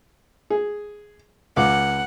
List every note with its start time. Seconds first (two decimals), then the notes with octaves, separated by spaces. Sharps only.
0.50 G#4
1.57 C#2 F5 F#5 D6